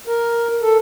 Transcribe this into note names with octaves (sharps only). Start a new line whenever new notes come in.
A#4
A4